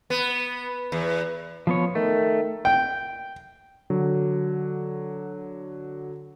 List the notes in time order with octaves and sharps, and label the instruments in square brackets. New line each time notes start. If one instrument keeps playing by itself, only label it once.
[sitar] B3
E2
[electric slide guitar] F3 B3 C#5
[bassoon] D#3 [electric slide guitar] A3
[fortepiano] G5
[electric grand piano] D3 F#3